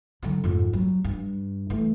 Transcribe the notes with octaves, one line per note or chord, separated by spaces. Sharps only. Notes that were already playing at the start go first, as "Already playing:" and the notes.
D3 F#3
F2 G#2
F#3
G2
E3 A3